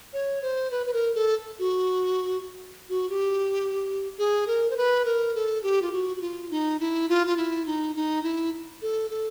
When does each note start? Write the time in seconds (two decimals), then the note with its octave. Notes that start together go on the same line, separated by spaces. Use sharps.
0.13 C#5
0.42 C5
0.71 B4
0.87 B4
0.93 A#4
1.15 A4
1.59 F#4
2.89 F#4
3.10 G4
4.19 G#4
4.47 A#4
4.70 C5
4.77 B4
5.05 A#4
5.35 A4
5.63 G4
5.82 F4
5.92 F#4
6.17 F#4
6.21 F4
6.51 D#4
6.80 E4
7.09 F4
7.27 F4
7.37 E4
7.66 D#4
7.96 D#4
8.24 E4
8.82 A4
9.10 A4